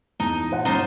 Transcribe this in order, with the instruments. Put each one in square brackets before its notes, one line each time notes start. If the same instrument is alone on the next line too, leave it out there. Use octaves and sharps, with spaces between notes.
[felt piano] E2 A5 [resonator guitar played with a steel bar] D#4
[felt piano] A#2 C5 F#5
[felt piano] G1 F#2 [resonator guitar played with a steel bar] D#4 F4 C5